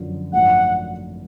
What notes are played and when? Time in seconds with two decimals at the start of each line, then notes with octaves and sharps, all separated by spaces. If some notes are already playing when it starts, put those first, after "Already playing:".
Already playing: F#2 D3 F3
0.33 G#1 F#2 F3 A3 D4 F#5